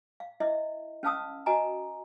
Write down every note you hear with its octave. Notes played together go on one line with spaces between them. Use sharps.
F5
E4 D#5 E5
C#4 B4 F5 A5 D#6 E6
F#4 D#5 G#5 A#5